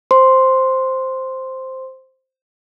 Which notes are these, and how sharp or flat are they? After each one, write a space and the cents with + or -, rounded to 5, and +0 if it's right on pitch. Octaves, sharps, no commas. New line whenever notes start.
C5 +0 C6 +0